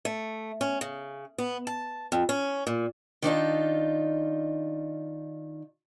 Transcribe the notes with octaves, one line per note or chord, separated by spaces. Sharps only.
A3
C#4
C#3
B3
A5
F2
C#4
A#2
D#3 D4 D#4 F4